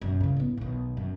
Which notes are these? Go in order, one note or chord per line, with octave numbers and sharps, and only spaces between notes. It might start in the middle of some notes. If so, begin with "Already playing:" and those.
F#2 B2
C#3 E3
A2 B3
B1 D#3
F#2